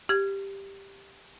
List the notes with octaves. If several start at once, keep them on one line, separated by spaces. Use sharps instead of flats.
G4 G#6